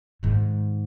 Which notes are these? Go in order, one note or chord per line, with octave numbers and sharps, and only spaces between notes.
G#2 D#3